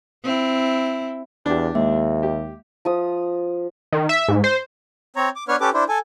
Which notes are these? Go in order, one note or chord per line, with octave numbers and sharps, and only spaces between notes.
C4 E4
E2 D4 G4
D#2 G#3 A#3 E5
G4
F3 D#6
D#3
E5
G#2
C5
C4 C#5 A#5
D6
B3 D4 B4 C#5 F6
C#4 G4 A4 B4 D6
D4 E4 C5
A4 G#5